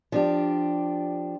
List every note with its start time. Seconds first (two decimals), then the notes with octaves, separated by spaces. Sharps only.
0.12 F3 D4 G4